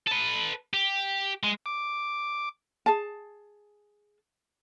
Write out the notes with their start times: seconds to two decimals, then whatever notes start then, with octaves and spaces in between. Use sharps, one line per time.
0.07 A4 B4
0.73 G4
1.43 G#3
1.66 D6
2.86 G#4 A5